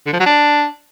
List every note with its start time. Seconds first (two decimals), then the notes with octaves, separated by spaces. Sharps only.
0.06 D3
0.13 F3
0.19 F#3
0.26 D4